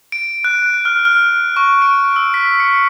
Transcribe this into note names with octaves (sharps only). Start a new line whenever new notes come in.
D7
F#6
F6
F6
C#6
D7
E6
B6
C#7